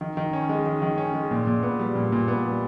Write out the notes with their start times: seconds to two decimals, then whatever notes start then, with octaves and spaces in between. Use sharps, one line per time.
0.01 D#3
0.17 D#3
0.33 C#4
0.49 G#3
0.66 D#3
0.82 D#3
0.98 C#4
1.14 G#3
1.31 A#2
1.47 A#2
1.63 B3
1.79 G3
1.95 A#2
2.12 A#2
2.28 B3
2.45 G3